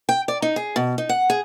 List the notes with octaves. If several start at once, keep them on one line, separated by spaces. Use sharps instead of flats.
G5
D5
D#4
G#4
B2
D#4
F#5
G#4